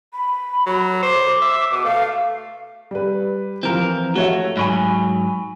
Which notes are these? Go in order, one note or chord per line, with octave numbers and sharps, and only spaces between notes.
B5
F#3
C5 D6
E5
B2
A3 F5
G3 B4
E3 F3 C4 A#4
A3 F#4 C#5 E5
G#2 F#3 G#5 B5 C#6